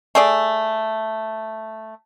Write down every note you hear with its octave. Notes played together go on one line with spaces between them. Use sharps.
A3 G#4 D5